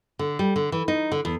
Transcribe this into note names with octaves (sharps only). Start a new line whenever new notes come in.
D3
G3
D3
E3
D#4
D3
E2